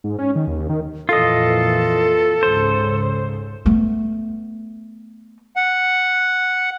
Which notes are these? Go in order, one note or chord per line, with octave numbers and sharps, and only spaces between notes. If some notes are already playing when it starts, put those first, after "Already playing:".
G#2
C#4
D#3
D#2
D#3
F2 A#2 E3 F4 A4 D#5
C#2 G#2 C#3 C5
A3 B3
F#5